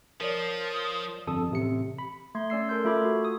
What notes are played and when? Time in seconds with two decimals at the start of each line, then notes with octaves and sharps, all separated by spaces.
0.21 F3 A#4 C#5 D5 D#6
1.27 G1 F2 A4 D#6
1.50 A1 C3 C#7
1.98 B5
2.35 A3 C6 G#6
2.50 C#4 D5 E6 C7
2.69 A4 A#4 C6 G6
2.85 A3 F4 A4 B5 D6 G#6
3.05 F#4
3.25 D#6